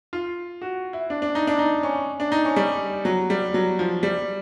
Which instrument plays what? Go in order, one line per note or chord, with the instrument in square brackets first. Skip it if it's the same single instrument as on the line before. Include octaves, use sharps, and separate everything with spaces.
[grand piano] F4
F#4
E4
D4
D4
D#4
D4
D#4
C#4
D4
D#4
C#4
G3
F#3
G3
F#3
F3
G3